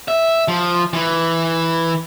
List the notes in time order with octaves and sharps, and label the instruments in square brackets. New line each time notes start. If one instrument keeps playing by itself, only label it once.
[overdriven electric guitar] E5
F3
E3